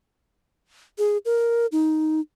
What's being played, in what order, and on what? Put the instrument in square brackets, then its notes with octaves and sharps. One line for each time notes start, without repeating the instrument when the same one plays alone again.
[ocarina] G#4
A#4
D#4